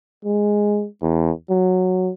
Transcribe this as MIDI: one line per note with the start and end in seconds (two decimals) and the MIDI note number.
0.25 0.86 56
1.02 1.31 40
1.50 2.12 54